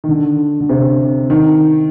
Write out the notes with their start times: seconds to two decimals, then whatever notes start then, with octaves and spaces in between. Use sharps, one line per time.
0.04 D#3
0.09 D3
0.60 D3
0.69 C3
1.30 D#3